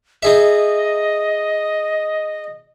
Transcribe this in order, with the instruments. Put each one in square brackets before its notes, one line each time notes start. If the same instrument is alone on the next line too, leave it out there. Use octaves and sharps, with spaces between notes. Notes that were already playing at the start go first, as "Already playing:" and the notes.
[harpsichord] D#4 G#4 E5 [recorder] D#5